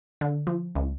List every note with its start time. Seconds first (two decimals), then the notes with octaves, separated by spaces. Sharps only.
0.21 D3
0.47 F3
0.75 C#2